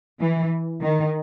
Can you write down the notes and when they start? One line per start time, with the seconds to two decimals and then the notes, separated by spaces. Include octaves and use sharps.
0.21 E3
0.82 D#3